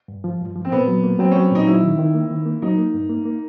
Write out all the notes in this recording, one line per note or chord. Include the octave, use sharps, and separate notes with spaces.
G2
F3
G2
F3
C4
A#2 B3
F#3
A#3
F#3 C4
C#4
F#3
A#2 D#4
F#3 E4
D#3
D#3
A#3
D#3
A#3
F#3 D#4
A#3
G2
A#3
A#3